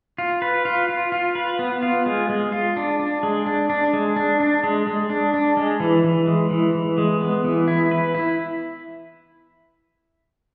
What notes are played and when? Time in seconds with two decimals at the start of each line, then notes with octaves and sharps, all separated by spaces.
0.18 F4
0.42 B4
0.65 F4
0.89 F4
1.12 F4
1.35 B4
1.59 B3
1.82 F4
2.06 G#3
2.29 G#3
2.52 F4
2.77 D4
3.00 D4
3.23 G#3
3.46 D4
3.70 D4
3.93 G#3
4.16 D4
4.40 D4
4.64 G#3
4.87 G#3
5.10 D4
5.34 D4
5.57 G#3
5.80 E3
6.04 E3
6.28 G#3
6.51 E3
6.74 E3
6.98 G#3
7.21 B3
7.45 E3
7.68 E4
7.91 B4
8.14 E4